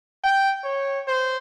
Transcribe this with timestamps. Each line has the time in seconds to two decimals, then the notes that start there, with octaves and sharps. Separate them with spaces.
0.24 G5
0.64 C#5
1.07 C5